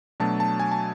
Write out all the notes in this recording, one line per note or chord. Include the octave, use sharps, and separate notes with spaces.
B2 F#3 A3 D4 A5
A5
G#5
A5